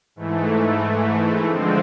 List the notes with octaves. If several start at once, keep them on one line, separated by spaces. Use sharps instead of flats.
G#2 E3 A3
D3 F3 G#3 C4